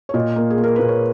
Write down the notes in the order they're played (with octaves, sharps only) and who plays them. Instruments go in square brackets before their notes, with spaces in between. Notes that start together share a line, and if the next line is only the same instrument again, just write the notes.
[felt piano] C#5
A#2 D#5
A#3
G#4
A#3
A#4
A#2 B4
C#5